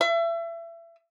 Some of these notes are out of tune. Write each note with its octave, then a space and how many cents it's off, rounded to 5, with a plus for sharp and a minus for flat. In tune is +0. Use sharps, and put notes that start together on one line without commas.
E5 +30